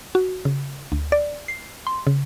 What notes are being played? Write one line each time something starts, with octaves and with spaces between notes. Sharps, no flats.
F#4
C#3
D2
D5
C7
C6
C#3